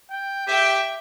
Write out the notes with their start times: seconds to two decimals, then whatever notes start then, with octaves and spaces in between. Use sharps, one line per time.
0.10 G5
0.47 G4 E5 G5